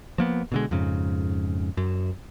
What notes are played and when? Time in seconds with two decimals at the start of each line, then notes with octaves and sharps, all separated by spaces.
0.18 F3 A#3 B3
0.52 B2 D3 G#3
0.71 F2 G#2 C#3
1.77 F#2